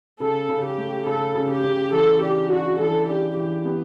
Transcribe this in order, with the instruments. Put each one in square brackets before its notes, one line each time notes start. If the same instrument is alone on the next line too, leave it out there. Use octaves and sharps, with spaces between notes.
[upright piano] C#3 [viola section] A4
[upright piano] C#3
[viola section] G4
[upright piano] A3
[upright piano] C#3 [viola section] A4
[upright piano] C#3
[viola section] G4
[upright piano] C#3
[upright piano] E3 [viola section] A4
[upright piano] D4 [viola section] G4
[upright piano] D4 [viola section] F#4
[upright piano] E3 [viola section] A4
[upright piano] D4 [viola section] G4
[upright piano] E3 [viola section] G4
[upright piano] B3